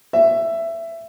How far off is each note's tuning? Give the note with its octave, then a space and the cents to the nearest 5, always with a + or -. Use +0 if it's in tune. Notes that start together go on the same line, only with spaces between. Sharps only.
E5 +15